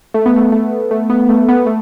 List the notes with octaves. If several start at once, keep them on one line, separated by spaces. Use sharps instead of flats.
A3
B3
A3
A3
A3
B3
A3
B3
A3